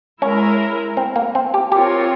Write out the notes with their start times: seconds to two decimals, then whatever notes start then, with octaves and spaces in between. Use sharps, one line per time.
0.22 G#3 C#4 E4 A#4
0.97 C4
1.16 A#3
1.35 C4
1.54 G4
1.72 C4 F4 G4 A#4 C#5